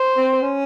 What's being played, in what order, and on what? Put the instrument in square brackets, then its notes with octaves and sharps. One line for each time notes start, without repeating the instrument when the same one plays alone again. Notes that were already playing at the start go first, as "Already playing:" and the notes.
Already playing: [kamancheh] C5
[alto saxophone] C4
C#4